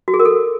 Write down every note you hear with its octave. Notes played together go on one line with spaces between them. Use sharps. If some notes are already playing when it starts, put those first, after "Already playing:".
F#4
G#4
A#4
A4